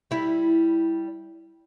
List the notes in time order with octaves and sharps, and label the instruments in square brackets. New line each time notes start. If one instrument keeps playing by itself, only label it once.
[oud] G3 E4